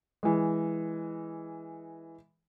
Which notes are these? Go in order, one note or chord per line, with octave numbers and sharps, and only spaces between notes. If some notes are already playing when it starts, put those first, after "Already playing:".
E3 G#3